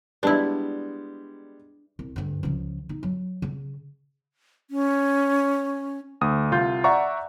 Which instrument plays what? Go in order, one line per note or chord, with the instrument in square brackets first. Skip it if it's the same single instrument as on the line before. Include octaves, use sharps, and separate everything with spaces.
[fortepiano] G3 G#3 B3 [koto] D4 E4
[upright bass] C2
D2 G2
C#2 F3
D#4
F#3
C#3
[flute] C#4
[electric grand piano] D2 D#6
C2 F4 G6
D5 E5 F#5 A#5 C#6